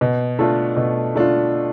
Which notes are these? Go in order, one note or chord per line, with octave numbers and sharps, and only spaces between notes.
B2
A3 D4 F4
B2
A3 D4 F4